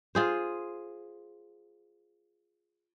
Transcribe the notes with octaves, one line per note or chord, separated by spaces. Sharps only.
F4 G#4 C5